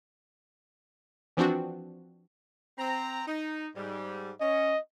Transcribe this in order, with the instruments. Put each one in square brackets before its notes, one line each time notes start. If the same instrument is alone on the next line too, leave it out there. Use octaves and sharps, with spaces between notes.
[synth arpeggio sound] E3 F3 C4 D4 F#4
[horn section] C4 A#5
D#4
G#2 G3
[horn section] C#4 [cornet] D#5